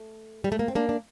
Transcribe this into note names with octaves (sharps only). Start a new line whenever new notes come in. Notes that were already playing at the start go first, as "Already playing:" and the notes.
Already playing: A3
G3
A3
A#3
C4
A#3 D4
D4